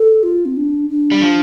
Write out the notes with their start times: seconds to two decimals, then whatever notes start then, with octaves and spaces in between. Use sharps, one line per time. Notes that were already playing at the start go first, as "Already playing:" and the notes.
Already playing: A4
0.23 F4
0.46 C4
0.57 D4
0.90 D4
1.11 G3
1.22 F3